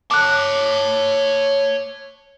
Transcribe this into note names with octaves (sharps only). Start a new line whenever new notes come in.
C#5 A5 D6 F#6